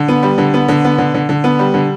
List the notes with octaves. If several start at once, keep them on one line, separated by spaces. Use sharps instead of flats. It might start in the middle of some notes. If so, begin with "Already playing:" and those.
Already playing: D3
B3
G3
D3
B3
D3
B3
D3
D3
D3
B3
G3
D3